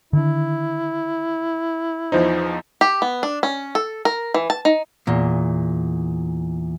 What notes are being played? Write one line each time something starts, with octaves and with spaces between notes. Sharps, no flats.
D3 D#3 D4 E4
E2 F3 D#4 C5
G4
B3
D4
C#4
A4
A#4
E3
A5
D#4
E2 A#2